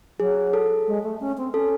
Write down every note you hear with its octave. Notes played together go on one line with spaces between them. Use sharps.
F#3 G#4
A4
G#3
A3
C#4
C4
C#4 A4